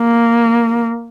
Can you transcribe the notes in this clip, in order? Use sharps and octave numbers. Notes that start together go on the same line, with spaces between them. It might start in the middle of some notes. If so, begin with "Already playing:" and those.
Already playing: A#3